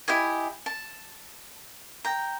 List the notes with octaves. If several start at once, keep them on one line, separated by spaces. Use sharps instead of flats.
E4 G4 D#5 G#5
A5
G5 A#5